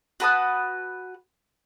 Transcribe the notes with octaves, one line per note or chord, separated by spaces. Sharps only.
F#4 B4 A5 D#6